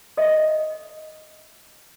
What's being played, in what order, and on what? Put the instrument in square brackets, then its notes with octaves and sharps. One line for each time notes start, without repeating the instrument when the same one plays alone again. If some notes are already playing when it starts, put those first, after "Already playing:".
[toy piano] A4 D#5 E5